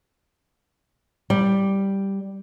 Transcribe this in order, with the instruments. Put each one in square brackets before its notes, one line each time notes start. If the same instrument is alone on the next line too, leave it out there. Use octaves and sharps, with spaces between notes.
[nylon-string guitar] G3